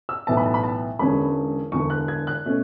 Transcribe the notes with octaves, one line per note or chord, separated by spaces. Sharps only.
E6
B1 A2 E3 B3 A5
B5
A5
B5
A5
E1 E2 D3 G#3 C#4 B5
E1 E2 D3 C#6
F#6
G#6
F#6
B2 A3 C#4